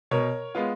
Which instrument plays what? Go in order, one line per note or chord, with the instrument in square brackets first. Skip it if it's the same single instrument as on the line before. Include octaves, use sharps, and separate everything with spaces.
[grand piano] B2 A#4 C#5
G#3 B3 F4